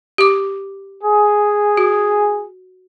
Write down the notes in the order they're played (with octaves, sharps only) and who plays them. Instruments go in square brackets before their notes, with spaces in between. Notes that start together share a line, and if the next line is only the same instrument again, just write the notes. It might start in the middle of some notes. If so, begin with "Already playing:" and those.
[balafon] G4 D6
[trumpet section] G#4
[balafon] F#4